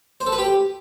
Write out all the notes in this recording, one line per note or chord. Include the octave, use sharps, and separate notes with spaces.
C5
A4
B4
G4